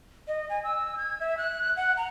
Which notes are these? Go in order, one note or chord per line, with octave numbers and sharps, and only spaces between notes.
D#5
G#5
E6
G#6
E5
F#6
F#5
A#5